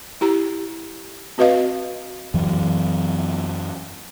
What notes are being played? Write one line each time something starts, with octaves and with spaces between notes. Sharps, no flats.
E4 G4 A#5
C4 F#4 B4 D#5 F5
F#2 E3 F#3